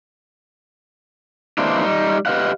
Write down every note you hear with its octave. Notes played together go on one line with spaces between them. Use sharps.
E3 G3 A#3 C4 D4 D#4
G3 D#4
G4 B4 D#5 F5 F#5